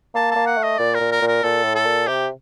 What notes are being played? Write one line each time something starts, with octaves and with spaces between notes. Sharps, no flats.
A#3 A5
A#3 A5
F#5
A3
D#5
A#2 D5
A#4
A#2
A#4
A#2
A#4
A#2 A4
A2
A4
A#2
C3 G4